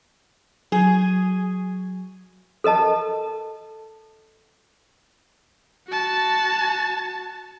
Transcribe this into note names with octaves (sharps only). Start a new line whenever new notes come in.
F#3 G#4
A4 A#4 D#5 A5
F#4 A5